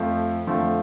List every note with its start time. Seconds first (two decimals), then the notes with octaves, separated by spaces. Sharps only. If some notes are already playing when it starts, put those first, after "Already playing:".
Already playing: F2 F3 A3
0.47 F2 D3 F3 A3